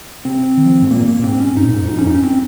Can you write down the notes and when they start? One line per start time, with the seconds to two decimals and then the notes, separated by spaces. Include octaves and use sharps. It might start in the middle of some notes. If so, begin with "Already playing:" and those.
0.25 C3 C4
0.57 D#3
0.66 F3
0.82 G#2
0.91 A#2 A#3
1.07 A#3
1.19 A#2
1.24 G#2 C4
1.40 C#4
1.57 G2 D#4
1.65 A#2
1.74 G#2
1.82 F2
1.89 D#4
1.99 C#4
2.07 D#4
2.15 C#4
2.24 C4